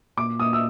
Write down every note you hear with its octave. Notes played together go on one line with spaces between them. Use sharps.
A#2 D6
A#2 D#6
E6